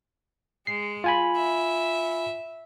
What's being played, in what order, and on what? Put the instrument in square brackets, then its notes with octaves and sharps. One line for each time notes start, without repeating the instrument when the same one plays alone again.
[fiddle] G#3 [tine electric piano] C7
[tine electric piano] F4 G#5 B5
[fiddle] E5